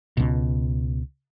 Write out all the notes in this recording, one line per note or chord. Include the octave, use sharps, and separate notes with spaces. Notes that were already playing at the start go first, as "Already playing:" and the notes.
C#2 B2